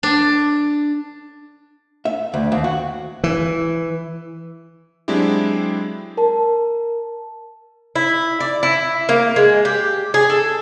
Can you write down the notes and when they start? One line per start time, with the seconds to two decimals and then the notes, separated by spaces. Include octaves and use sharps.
0.03 D4
2.05 E5
2.34 D2
2.52 D#2
2.64 F#4
3.24 E3
5.08 F#3 G#3 C4 D4 E4 G4
6.17 A#4 A5
7.96 E4
8.40 D5
8.63 E4
9.09 A#3
9.36 G#3
9.65 G4
10.14 G#4
10.30 A4